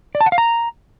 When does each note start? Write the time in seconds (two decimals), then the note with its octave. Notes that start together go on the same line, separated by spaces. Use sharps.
0.15 D5
0.21 A5
0.26 F#5
0.32 F5
0.38 A#5